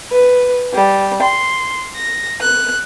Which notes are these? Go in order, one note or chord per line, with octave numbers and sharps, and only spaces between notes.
B4
G3
C6
A#6
F#6